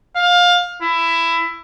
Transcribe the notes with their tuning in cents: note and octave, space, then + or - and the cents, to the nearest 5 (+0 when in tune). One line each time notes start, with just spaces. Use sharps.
F5 +20
E4 +15